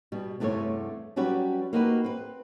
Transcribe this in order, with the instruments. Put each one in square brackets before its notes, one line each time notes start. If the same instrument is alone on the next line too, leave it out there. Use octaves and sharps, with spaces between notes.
[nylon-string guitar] B2 G3
E2 G2 C3 A3 B3 C#5
F#3 G3 C#4 F#4 G4 B4
A#3 D#4 F#4 G4 A4 B4
C4 B4